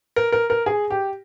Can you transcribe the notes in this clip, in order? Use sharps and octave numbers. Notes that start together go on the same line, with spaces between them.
A#4
A#4
A#4
G#4
G4